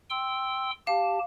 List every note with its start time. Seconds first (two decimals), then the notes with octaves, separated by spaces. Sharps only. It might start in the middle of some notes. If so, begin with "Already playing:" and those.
0.10 G5 C6 E6
0.87 G4 F5 A5